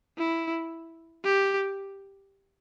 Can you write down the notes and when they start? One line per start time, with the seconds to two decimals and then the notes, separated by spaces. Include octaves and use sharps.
0.18 E4
1.24 G4